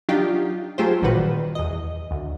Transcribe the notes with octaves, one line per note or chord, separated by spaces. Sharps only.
F#3 D4 D#4 F4 G4
F#3 A3 F4 G4 G#4 C5
A1 A#2 D#3 G3 F#4 B4
E2 D#5
D2